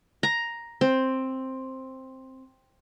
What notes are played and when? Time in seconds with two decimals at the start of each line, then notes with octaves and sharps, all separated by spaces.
0.23 A#5
0.81 C4